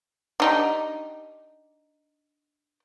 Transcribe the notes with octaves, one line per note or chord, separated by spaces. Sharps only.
D4 D#4 G4